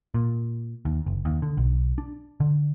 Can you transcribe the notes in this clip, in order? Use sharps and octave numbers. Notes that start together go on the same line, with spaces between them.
A#2
D#2
F#1
D#2
D3
B1
D4
D3